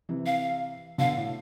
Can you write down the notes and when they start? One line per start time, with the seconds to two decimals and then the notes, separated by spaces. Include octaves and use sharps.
0.09 C3 E3
0.26 F5
0.98 B2 D3 F5
1.17 A2